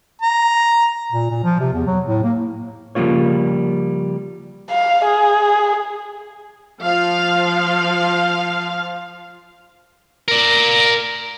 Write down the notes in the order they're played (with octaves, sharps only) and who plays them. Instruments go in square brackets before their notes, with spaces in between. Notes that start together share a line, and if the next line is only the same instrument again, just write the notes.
[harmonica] A#5
[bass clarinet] A#2
A#2
F3
C3
E2
F#3
A2
A#3
[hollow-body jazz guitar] C#3 F3 G3 A#3 F4 C#5
[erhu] F5
G#4
[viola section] F3 F5
[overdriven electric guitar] A#4 D5